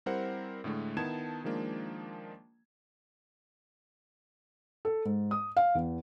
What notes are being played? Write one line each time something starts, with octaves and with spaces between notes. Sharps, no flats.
G3 C4 E4 A#4 C5 F#5
A2 D3 G#3 A3
D#3 B3 E4 A5 G#6 E7
D#3 F3 G#3 A#3 D4
A4
G#2
D#6
F5
E2